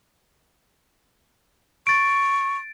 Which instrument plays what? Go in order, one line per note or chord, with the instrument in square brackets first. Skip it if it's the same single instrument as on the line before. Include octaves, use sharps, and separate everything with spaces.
[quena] C#6 [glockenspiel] A6 D7